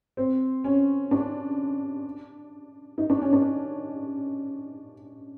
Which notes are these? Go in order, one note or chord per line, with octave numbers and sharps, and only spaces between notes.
C4
C#4
D4
D#4
D4
C#4
D4